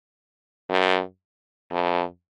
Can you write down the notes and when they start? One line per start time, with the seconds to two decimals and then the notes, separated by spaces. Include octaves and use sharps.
0.69 F#2
1.72 F2